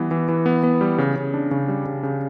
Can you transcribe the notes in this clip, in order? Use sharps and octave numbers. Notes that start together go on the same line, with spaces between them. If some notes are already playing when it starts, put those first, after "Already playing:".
Already playing: E3 G3 B3
E3
E3
B3
B3
G3
C#3
C#3
D4
C#3
G3
C#3
C#3